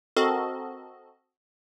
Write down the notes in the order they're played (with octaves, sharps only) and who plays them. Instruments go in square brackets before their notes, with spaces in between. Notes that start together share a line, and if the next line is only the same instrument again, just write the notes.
[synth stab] C4 F#4 A4 A#4 D#5